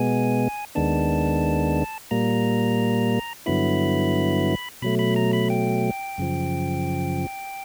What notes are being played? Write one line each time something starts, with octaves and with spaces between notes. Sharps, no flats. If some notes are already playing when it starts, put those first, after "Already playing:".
Already playing: B2 G#3 B3 G#5
D#2 D#3 G#3 B3 D4 A5
A#2 G3 A#3 A#5
G2 D3 F#3 B3 E4 B5
B2 F#3 A3 B5
B5
A#5
B5
G5
F#2 C#3 F3